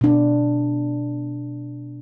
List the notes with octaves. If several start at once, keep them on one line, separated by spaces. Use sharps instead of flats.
B2 D4